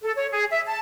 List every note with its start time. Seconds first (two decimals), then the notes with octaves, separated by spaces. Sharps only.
0.02 A4
0.16 C#5
0.31 G#4
0.50 E5
0.66 A5